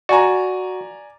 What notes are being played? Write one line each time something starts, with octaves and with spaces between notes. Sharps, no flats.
F#4 D5 G#5 A#5